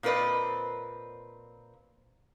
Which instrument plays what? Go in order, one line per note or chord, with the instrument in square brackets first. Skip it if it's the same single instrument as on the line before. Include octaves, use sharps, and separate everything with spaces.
[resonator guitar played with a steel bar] A#2 C4 A#4 B4 D5 D#5